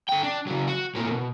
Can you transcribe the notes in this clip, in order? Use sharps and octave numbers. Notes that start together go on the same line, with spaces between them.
D3 G5
D4
C#3 F#3
F#4
A2 A#3
B2